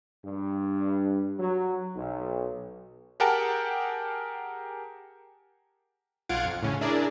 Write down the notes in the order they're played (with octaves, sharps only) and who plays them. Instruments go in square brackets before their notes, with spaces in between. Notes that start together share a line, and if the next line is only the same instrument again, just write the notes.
[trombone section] G2
F#3
B1
[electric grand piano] G4 G#4 A#4 F#5 G5 A5
[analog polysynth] B1 F4 F5 F#5 G#6 D7
F2
A2 C#3 C#4
D4 E4 G#4 A#4 D5